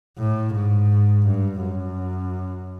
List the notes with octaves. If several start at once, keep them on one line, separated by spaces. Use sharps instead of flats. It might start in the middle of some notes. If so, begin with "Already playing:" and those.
A2
G#2
G2
F#2